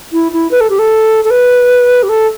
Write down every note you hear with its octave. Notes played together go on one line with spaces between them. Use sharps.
E4
E4
B4
A4
G4
A4
A4
B4
G4
A4